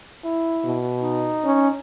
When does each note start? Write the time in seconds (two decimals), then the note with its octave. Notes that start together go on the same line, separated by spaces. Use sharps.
0.24 E4
0.65 B2
1.02 D#4
1.45 C#4